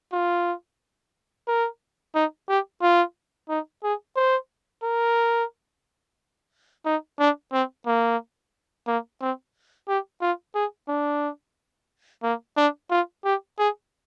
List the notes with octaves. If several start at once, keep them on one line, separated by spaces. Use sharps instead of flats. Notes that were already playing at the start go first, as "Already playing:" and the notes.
F4
A#4
D#4
G4
F4
D#4
G#4
C5
A#4
D#4
D4
C4
A#3
A#3
C4
G4
F4
G#4
D4
A#3
D4
F4
G4
G#4